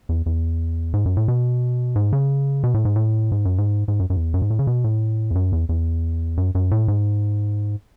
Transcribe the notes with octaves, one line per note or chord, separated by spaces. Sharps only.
E2
E2
G#2
F#2
A2
B2
G#2
C#3
B2
A2
G#2
A2
G#2
F#2
G#2
G#2
F#2
F#2
E2
F#2
G#2
A2
C#3
B2
A2
E2
F#2
E2
E2
F#2
F#2
A2
G#2